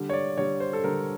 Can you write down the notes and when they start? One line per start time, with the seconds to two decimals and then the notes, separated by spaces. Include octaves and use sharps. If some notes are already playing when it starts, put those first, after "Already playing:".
Already playing: D3 G3
0.09 C#5
0.13 D5
0.37 D3 G3 C#5
0.60 C5
0.73 A4
0.84 D3 G3 A#4